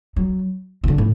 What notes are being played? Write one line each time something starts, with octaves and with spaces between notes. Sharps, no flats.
F#3
C#3
D3
A2